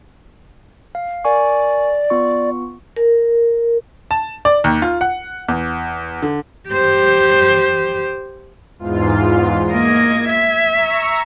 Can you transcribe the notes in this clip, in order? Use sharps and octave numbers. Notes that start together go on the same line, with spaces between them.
F5
A#4 D5 G#5 C#6
B3 F4 C#6
A#4
A5
D5
D#2
F4
F#5
E2
D3
G4 C5
E2 G#2 F4
A#3 D#5 G#6
E5
A#5 C#6 E6